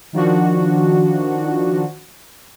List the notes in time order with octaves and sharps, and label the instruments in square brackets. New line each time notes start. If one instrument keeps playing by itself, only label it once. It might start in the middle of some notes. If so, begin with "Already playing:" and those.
[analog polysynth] D#3 F3 D4 F#4